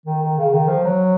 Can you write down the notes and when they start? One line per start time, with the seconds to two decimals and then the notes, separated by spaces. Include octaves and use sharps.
0.06 D#3
0.21 D#3
0.38 C#3
0.53 D#3
0.68 F3
0.84 F#3